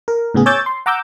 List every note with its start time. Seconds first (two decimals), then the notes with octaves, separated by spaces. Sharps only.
0.08 A#4
0.34 A2 C#3 B3 G#4
0.46 C#5 G#5 D6 E6 G6 A6
0.66 C6
0.86 F#5 A#5 D6 E6 G6